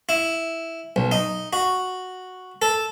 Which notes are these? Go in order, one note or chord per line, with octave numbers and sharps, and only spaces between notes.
E4
B1
D#4
F#4
A4